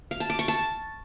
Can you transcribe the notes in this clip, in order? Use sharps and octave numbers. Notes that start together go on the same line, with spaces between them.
F5
A5
D6
C#6
A5